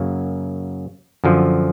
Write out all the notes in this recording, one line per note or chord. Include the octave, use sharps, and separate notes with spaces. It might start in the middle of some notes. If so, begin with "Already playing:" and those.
Already playing: F#2 C#3 F#3 A#3
F#2 D3 F3